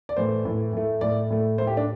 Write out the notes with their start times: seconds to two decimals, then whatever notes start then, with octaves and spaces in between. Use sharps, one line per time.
0.09 D5
0.17 A2 E3 A3 C5
0.45 A2 E3 A3
0.73 A2 A3
1.01 A2 A3 D5
1.30 A2 A3
1.58 A2 A3 C5
1.67 G4
1.77 D4